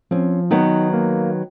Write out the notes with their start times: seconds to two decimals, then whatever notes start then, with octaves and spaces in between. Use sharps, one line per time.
0.11 F3 C4 C#4
0.51 D#3 F#3 B3 D#4
0.93 A#3